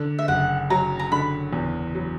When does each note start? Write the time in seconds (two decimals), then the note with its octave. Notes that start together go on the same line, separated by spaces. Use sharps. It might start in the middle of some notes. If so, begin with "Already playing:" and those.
Already playing: D3
0.19 E5
0.28 F#1 F#5
0.70 F#3 A#5
0.99 A#5
1.12 D3 B5
1.53 E2
1.95 F#3